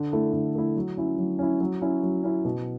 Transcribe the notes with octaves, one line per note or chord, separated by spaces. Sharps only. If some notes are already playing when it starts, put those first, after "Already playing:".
Already playing: D3
A3 E4
D3
A3 E4
F#3
C#4 E4
F#3
C#4 E4
F#3
C#4 E4
F#3
C#4 E4
B2